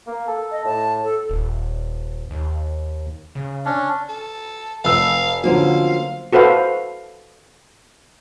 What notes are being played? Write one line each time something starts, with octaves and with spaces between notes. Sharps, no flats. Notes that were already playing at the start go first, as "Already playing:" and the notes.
A#3
A4
D#5
A2 A5
A4
D#1
D#2
C#3
C#4 D4
A4
F1 F5 E6
D3 F3 F#3 A#3 C#4 C5 F5
F#4 A4 B4 C5 F5